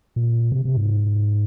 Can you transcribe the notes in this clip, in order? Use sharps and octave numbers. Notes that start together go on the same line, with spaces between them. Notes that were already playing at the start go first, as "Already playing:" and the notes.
A#2
C3
C3
G#2